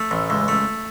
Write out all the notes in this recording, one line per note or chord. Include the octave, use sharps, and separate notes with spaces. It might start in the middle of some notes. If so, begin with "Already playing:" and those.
Already playing: A3
A1
C#2
A3